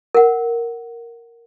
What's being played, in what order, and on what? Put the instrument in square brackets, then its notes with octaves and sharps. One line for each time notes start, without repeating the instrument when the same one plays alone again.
[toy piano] A#4 F#5